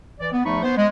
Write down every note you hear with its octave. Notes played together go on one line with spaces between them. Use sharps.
E3 D5
B3
E2 F3 A3 D#4 B5 C#6
B3 C5
G#3